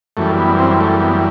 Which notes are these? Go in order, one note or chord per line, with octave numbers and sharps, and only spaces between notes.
F#2 E3 G3 A3
B3
C4
A3
B3